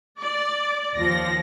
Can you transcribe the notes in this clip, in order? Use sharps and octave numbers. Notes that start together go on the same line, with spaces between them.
D5
D#2 F3 A#6